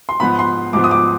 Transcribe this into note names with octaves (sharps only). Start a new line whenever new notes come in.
C6
G#2 F3 B3 B5
C6
G#2 F3 B3 D6
D#6
D6